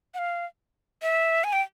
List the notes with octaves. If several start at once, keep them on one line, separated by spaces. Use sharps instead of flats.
F#5
F5
E5
G#5
G5